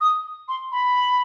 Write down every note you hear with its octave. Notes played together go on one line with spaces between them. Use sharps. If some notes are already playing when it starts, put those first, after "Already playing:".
D#6
C6
B5